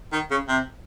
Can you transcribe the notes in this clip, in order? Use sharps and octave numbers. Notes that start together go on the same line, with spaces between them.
D#3
C#3
C3